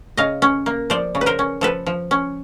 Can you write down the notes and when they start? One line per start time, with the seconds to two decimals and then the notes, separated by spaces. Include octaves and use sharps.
0.17 C#3 D#5 F5
0.42 C#4
0.66 A#3
0.90 F3 C5 D5
1.15 C#3
1.21 B4
1.26 A#4 C5
1.39 C#4
1.61 F3 A4 B4
1.86 F3
2.11 C#4